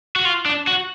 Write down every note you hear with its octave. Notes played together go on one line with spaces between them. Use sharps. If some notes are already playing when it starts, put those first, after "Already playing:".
F#4
F4
D4
F#4